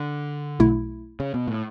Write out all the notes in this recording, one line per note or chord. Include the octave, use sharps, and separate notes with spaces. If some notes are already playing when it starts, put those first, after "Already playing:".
Already playing: D3
B1 B2 A3 E4
C#3
B2
A2